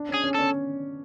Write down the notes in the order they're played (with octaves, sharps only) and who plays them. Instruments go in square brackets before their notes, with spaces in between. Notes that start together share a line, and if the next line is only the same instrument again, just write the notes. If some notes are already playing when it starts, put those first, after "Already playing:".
Already playing: [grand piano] D4
[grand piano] C#4 [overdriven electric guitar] G#4
[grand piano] C#4
[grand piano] C#4 [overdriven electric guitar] A4